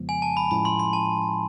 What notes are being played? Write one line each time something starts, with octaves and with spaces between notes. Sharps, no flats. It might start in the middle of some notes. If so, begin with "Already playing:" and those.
Already playing: F2 C#3 F3 G#3 B3
G#5
A5
B5
A2 F3 G#3 C#4 E4 B5
C6
C6
A5